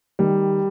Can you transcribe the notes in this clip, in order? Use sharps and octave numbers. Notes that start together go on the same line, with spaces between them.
D#3 G3